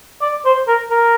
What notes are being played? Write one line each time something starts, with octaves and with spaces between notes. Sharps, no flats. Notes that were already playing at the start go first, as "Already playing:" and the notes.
D5
C5
A#4
A#4